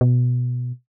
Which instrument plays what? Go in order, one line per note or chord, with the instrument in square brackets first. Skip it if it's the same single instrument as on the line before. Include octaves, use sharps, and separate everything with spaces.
[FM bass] B2